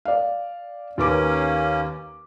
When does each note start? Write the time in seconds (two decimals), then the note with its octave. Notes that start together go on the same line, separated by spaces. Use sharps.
0.05 D5 F5
0.98 D#2 A#3 C#4 B4 D6